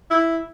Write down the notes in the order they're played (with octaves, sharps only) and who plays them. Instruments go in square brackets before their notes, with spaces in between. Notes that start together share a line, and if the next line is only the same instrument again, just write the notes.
[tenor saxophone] E4